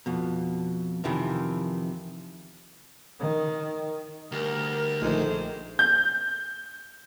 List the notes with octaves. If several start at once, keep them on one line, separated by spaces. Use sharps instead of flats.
F2 B2
F2 C3 D#3 E3
D#3
D2 G3 A#4
A#1 G#2 D#3 G#3 A3 C5
G6